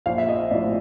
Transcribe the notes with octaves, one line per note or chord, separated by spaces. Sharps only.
A#1 F5
E5
D#5
A2 F3 D5